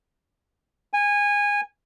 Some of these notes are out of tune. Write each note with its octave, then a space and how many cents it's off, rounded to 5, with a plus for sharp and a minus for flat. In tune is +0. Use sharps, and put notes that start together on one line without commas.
G#5 -20